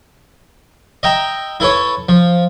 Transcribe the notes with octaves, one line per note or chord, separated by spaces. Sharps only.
D#5 E5 G5 A#5
E4 A4 B4 C#5
F3